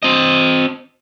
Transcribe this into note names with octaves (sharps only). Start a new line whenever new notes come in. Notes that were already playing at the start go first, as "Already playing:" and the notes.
C4 D#5